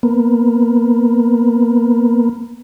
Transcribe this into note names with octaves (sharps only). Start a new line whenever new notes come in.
A#3 B3